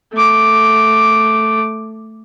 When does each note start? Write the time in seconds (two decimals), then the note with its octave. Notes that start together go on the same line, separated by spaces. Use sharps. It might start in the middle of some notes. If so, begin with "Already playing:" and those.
0.13 A3 D6